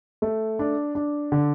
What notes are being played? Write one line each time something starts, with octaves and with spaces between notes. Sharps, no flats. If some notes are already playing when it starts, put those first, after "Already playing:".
A3
D4
D4
D3